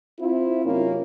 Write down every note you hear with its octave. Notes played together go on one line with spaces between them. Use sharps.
C4 E4 F4
F#2 C3 A#3 C#4 D#4 F4